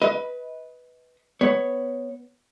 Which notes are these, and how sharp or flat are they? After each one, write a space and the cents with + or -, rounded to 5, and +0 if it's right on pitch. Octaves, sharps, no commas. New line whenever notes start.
B4 +0 D#5 +30
B3 +10 C#5 +0